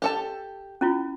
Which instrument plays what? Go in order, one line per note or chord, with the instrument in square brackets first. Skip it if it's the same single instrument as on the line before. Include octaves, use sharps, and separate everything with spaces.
[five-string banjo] G4 A4 A5
[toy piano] C#4 E4 F4